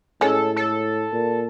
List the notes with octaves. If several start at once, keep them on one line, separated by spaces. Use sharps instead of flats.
A2 G#3 C#4 A4
A4
A#2